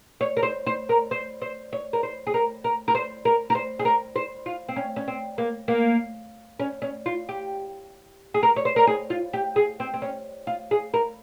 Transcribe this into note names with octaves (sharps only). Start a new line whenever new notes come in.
C#5
A#4
C5
C5
A#4
C5
C5
C#5
A#4
C5
G#4
A#4
A#4
A#4
C5
A#4
A#4
C5
G#4
A#4
C5
F4
C4
C#4
C#4
C4
A#3
A#3
C#4
C#4
F4
G4
G#4
A#4
C#5
C5
A#4
G#4
F4
G4
G#4
C4
C4
C#4
F4
G#4
A#4